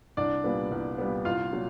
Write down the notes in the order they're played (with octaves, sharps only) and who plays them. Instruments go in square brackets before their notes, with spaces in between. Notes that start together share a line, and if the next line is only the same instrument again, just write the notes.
[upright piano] C2 [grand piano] D4 D5
[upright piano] A#2 G3 B3
C2
A#2 G3 B3
[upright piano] C2 [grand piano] F4 F5
[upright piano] A#2 F#3